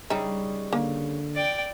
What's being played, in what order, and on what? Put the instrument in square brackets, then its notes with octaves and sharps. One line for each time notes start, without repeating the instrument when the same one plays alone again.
[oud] C#3 G3 D#4 [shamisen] E5
[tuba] D3 [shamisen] A#3
[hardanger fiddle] D5 G5